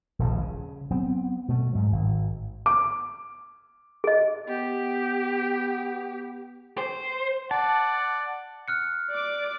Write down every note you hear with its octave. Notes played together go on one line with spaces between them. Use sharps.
D#1 A#1 C#3
C#3
F#3 B3 C4
B2 A3
G#2 F#3
G#1 D#3
D6
G#4 D#5
B3 G4
C5
D5 F#5 A5
F6 F#6 C#7
D5 D6